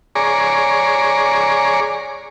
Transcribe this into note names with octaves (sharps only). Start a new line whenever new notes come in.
G#4 C#5 D5 A#5